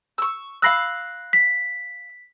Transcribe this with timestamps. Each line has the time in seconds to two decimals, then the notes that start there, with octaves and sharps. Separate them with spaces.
0.18 C#6 E6
0.62 F5 B5 E6 F#6 A#6 C7
1.33 B6